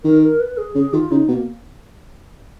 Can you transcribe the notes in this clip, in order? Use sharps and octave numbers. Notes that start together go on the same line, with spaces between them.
D#3 A#4
A#4
B4
G#4
C#3 G#4
D#3 F4
C#3 D#4
B2 A#3